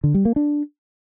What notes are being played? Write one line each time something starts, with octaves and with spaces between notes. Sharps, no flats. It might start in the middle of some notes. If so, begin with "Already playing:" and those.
D3
G3
A#3
D4